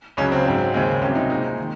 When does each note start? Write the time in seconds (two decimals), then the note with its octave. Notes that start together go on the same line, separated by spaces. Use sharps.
0.17 C#2 C#3 F#3 C#4
0.32 C4
0.46 G#2 F#3 C4
0.74 D#2 C#3 G#3 C4
1.01 C2 C3 F#3 C#4
1.15 D#4
1.30 A#2 G#3 C4 D#4
1.59 D#3